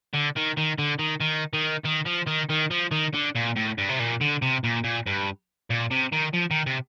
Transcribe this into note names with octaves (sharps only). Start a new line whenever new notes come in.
D3
D#3
D#3
D3
D#3
D#3
D#3
D#3
F3
D#3
D#3
F3
D#3
D3
A#2
A2
G2
C3
A#2
D3
C3
A#2
A#2
G2
A#2
C3
D#3
F3
D#3
C3